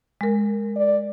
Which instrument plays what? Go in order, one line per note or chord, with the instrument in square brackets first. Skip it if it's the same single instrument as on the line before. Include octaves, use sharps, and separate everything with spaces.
[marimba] G#3 A#4
[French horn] D5